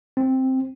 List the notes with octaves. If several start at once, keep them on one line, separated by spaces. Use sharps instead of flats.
C4